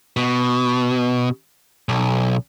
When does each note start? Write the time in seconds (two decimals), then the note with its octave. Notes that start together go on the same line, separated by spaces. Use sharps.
0.17 B2
1.89 B1